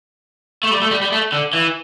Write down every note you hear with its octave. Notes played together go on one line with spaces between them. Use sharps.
A3
G3
A3
G3
G3
A3
D3
E3